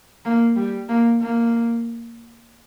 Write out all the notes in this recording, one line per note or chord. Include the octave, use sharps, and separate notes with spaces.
A#3
G3
A#3
A#3